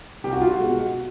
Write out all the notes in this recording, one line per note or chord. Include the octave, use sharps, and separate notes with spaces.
C2 G4
F#4
F4
F#4
B2 G#3